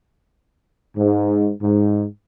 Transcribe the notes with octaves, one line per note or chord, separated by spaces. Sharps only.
G#2
G#2